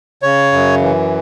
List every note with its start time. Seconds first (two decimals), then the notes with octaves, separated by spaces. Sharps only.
0.23 C#3 C#5
0.52 F#2
0.81 E3